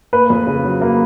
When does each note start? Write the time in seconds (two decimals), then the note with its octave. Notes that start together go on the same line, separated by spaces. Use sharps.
0.13 A#3 B4
0.30 F2
0.47 C#3
0.65 F#3
0.81 A#3